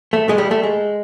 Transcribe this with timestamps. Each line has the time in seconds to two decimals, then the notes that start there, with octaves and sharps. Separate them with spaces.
0.13 A3
0.29 G#3
0.38 G3
0.51 A3
0.63 G#3